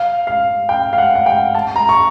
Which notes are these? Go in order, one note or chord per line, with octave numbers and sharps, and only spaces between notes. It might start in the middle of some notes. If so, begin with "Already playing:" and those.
Already playing: F5
F5
G5
F5
F#5
F#5
G5
A5
A#5
C#6